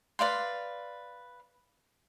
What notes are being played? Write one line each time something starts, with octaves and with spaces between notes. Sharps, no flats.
B4 D5 F5 C6